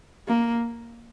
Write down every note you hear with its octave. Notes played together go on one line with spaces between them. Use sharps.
A#3